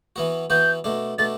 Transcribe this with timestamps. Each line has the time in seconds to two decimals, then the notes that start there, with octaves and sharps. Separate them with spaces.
0.16 E3 B3 F#4
0.50 E3 B3 F#4 G6
0.84 B2 A3 D4
1.19 B2 A3 D4 A6